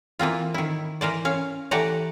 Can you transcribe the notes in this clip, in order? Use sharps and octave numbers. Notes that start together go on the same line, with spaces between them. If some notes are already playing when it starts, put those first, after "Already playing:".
E3 A#3 C4 F4
D#3 E4
E3 A#4 C5 D5
C#4 F5
E3 A3 G4 D5 F#5 A#5